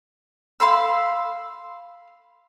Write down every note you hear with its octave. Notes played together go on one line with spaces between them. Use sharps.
F5 B5 C6 E6